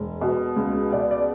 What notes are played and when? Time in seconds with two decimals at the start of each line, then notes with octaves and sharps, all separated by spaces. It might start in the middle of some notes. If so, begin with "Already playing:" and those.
Already playing: E1
0.21 B2
0.56 C#2
0.92 B2 D5
1.11 D5